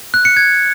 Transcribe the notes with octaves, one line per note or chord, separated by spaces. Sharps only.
F#6
C#7
G#6